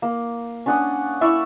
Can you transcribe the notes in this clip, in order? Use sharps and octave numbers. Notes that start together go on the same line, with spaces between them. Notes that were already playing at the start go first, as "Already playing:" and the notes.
A#3
C#4 D4 F#5 D#6
E4 D5 E5 C#6